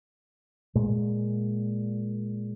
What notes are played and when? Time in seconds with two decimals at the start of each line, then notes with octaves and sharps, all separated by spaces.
0.75 A#2 G#3